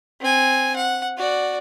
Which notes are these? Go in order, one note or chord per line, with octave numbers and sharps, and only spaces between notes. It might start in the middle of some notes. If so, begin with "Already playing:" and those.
C4 G#5
F#5
F#4 D5